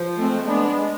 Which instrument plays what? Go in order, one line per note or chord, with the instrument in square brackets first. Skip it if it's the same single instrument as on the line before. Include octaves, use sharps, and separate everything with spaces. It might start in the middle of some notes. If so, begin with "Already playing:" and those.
Already playing: [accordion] F3
[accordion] G#3 [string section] A3 C4
[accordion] G#3 [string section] B3 D4
[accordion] G#3